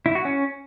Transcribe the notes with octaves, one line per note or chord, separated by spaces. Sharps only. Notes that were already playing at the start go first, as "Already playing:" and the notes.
E4
F#4
C#4